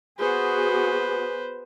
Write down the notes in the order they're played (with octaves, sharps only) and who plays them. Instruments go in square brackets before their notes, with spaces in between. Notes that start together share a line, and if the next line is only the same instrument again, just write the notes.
[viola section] B3 F#4 G#4 [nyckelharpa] B4 C5